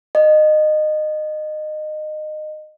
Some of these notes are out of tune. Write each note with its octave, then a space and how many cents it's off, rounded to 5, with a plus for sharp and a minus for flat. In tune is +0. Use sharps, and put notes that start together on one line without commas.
D#5 -20